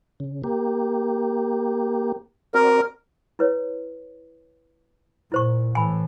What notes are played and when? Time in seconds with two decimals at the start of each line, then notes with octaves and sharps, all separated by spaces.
0.20 C#3
0.44 A#3 G4
2.54 C4 F#4 A#4 D5
3.39 E4 B4 C#5
5.32 A#2 E4 C5 C#6
5.75 A2 E3 G#5 B5